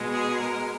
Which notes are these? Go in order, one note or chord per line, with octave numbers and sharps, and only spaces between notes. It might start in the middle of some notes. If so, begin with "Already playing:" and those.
Already playing: B2 G#3
G#4
A#4